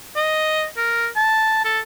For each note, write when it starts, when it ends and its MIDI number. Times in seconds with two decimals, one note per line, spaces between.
0.16 0.65 75
0.77 1.07 70
1.16 1.61 81
1.65 1.79 69